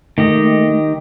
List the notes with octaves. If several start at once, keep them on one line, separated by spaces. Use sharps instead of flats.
D#3 A3 G4 D#5